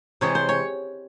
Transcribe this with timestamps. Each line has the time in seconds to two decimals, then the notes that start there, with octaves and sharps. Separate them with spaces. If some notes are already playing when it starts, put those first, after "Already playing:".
0.21 C3 E3 G#3 C#5
0.35 C5
0.49 C#5